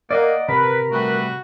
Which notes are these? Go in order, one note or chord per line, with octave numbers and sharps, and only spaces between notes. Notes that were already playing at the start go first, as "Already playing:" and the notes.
A#3 D5 D#5 F#5
C3 A#4 B4 B5
G3 A3 F#4 B4